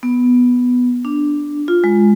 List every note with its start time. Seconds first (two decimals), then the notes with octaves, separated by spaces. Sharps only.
0.03 B3
1.05 D4
1.68 F4
1.84 G#3